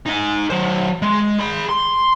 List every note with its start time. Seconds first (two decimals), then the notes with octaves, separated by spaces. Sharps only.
0.06 D#4 G#5
0.50 F#3 C5
1.02 G#3
1.39 G#4 B5
1.69 C6